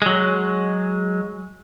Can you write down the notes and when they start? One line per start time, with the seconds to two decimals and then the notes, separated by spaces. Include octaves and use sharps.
0.02 F#3 G#3